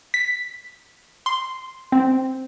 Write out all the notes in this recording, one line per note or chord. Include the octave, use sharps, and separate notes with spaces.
B6
C6
C4